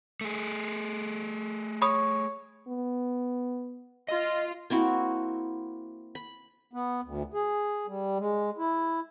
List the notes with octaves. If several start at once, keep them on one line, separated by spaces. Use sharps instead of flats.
A3 G#4
C#5 B5 D#6
B3
F4 D#5
A#3 C4 E4 F#4
B5
B3
D2
G#4
G3
G#3
E4